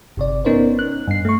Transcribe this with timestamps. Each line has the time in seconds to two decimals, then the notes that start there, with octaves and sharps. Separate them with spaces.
0.17 G1 C3 D5
0.45 B3 C#4 D#4 A#4 C5 C#5
0.79 F#6
1.07 G2 C7
1.25 A3 C#6